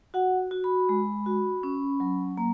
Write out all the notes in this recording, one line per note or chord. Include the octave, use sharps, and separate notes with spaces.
F#4 F#5
F#4
B5
G#3
F#4
C#4
F#3
A#3 A#5